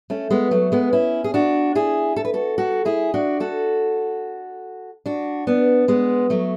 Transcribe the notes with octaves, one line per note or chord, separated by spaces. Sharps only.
A3 C#4
G#3 B3
F#3 A3
G#3 B3
C#4 E4
G#4
D4 F#4
E4 G#4
A4
B4
F#4 A4
F#4 A4
E4 G#4
D4 F#4
F#4 A4
D4 F#4
B3 D4
G#3 B3
F#3 A3